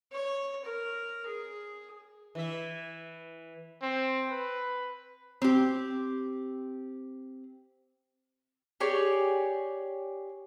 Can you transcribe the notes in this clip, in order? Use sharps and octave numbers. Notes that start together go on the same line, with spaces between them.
C#5
A#4
G#4
E3 E5
C4
B4
C4 G4
G4 G#4 C#5 D5